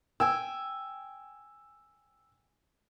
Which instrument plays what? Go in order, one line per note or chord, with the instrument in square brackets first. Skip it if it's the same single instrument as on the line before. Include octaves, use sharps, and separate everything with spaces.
[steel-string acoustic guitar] G5 G#5 [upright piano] E6